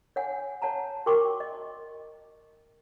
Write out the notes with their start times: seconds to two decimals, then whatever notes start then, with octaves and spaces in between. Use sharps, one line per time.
0.16 C#5 F#5 G#5
0.62 C#5 F#5 A5 A#5
1.06 F#4 A#4 G5 C#6 D6
1.40 D#5